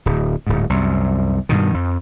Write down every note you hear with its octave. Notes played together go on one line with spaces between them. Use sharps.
D1
D1 G#2
C2 F#2
G2 B2 D#3
F2